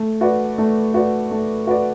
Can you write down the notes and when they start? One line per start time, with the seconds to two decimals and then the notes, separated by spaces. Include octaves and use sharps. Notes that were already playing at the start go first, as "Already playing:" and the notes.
Already playing: A3
0.21 F#4 B4 D5
0.58 A3
0.94 F#4 B4 D5
1.31 A3
1.67 F#4 B4 D5